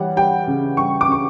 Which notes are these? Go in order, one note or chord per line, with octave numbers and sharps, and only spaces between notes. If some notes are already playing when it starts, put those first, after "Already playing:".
Already playing: E3 G3 C#5 F#5
G3 G5
C#3
G3 C#6
D6
C#3 C#6